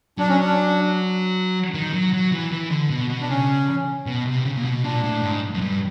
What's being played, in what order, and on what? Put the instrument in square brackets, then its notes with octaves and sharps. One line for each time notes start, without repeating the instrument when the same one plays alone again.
[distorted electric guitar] F#3 [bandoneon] D4
[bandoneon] C#4
D4
[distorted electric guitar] D#3
F#3
F#3
E3
E3
D3
B2
B2
[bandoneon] D4
[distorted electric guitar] C#3 [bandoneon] C#4
[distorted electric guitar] B2
C3
C#3
A#2
B2
[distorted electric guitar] A#2 [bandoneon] D4
[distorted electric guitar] A2
G#2
F#2
G2